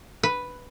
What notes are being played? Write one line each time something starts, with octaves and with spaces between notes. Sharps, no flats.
B4